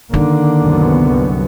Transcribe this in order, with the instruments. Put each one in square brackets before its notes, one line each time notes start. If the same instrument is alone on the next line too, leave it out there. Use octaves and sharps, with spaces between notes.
[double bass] D3 A#3 [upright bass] D#3
[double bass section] C2 F#2 B3